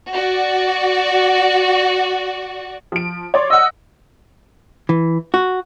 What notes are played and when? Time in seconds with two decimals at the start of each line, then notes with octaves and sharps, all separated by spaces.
0.11 F#4 D5
2.92 F3 D7
3.34 C#5 D5 C6
3.50 D#5 F#5 E6
4.89 E3
5.34 F#4